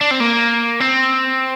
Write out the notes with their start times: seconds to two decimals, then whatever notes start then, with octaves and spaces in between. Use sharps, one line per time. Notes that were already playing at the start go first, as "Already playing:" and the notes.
0.01 D4
0.11 C4
0.20 A#3
0.80 C4